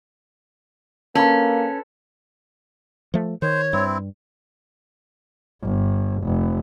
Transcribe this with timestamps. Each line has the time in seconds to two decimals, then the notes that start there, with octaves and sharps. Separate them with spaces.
1.15 A#3 C#4 A4 B4
3.14 F3 A3
3.42 D#3 C5 C#5
3.73 G2 C4 E4
5.62 G1
6.23 F1